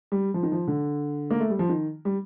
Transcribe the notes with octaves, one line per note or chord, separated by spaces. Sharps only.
G3
F3
D#3
F3
D3
A#3
A3
G3
F3
D#3
G3